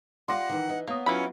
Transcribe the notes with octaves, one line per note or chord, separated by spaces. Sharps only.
G3 F4 F#5 C6 D6 A#6
D#3 E3
E3 D#4
A#3 B3 C#5 D#6
E3 F#3 C#4 E4 F4 B4 B5